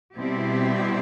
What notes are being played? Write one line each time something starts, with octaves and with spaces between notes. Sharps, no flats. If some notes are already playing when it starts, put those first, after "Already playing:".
B2 G3 C4 E4 G4